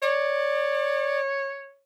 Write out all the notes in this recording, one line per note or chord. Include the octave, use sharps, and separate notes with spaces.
C#5 D5